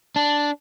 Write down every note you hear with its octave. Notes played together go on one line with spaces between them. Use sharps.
D4